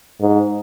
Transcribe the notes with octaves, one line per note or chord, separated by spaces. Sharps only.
G#2